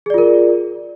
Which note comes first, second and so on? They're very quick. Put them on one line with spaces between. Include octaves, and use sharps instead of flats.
G#4 D5 F4 A#4